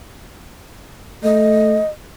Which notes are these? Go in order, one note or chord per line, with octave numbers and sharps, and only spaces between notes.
A3 D#5